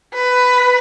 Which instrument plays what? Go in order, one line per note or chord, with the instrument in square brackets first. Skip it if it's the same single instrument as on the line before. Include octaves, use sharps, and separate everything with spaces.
[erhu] B4